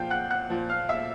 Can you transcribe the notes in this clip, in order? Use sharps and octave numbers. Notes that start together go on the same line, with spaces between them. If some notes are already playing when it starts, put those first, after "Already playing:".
Already playing: A#2 F3 F5 G5 G6
F#5 F#6
F#5 F#6
A#2 F3
F5 F6
E5 E6